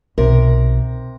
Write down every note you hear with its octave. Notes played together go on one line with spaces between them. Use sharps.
B1 C3 A#4